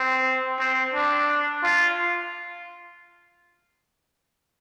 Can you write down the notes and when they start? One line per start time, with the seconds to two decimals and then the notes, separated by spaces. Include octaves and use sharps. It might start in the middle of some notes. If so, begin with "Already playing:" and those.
Already playing: C4
0.59 C4
0.94 D4
1.63 F4